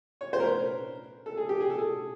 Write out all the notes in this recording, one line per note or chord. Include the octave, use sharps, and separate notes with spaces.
C#5
C5
A#4
B4
A4
G#4
G4
G#4
A4
G#4